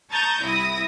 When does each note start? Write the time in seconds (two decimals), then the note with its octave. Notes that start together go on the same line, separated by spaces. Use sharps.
0.12 A5 A#5 C#6 D#6 G6 A6
0.42 C2 E4 D#6 A#6